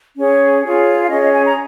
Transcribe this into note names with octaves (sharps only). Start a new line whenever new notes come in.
C#4 G#4 C#5
F4 G#4 C#5
F5
C#4 G#4 C#5 D#5
D#5
G#5
A#5